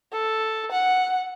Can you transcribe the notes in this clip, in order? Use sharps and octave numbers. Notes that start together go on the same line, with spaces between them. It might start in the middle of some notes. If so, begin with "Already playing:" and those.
A4
F#5